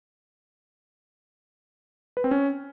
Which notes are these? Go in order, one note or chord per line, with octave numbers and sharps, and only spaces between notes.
B4
C4
C#4